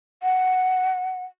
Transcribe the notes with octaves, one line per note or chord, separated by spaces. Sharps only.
F#5